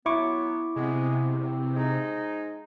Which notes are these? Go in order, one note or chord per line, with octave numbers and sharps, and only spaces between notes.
F#3 B3 E4 C#6 D6
C3 G#3 B3
E2 C4
F3 G#3 D#4